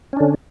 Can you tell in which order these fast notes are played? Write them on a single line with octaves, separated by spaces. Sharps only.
C#4 D4 D3